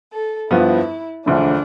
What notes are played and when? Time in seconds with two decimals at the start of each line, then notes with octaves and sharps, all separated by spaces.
0.12 A4
0.51 G2 F3 B3 E4 F4
1.26 E1 D2 D3 F3 D4